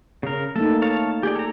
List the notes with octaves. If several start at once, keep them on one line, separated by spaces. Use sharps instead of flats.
C#3 A#4
A3 A#3 D#4 A4
C#5 F5 A5
G4 G#4 D5
A4 A#5